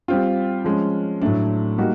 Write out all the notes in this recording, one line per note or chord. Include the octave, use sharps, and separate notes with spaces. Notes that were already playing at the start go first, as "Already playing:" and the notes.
G3 C4 F4
F3 G#3 C#4
A2 F#3 A3 D4
G3 A#3 D#4 F#4